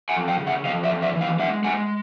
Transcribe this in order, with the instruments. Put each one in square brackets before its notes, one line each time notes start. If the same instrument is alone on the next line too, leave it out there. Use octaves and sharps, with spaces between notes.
[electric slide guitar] F#5 G#5
F2
F5 G5
C#3
E5 F#5
F2 D#5 F5
D5 E5
F2
D5 E5
E3
D#5 F5
G#3 E5 F#5
G#3 F#5 G#5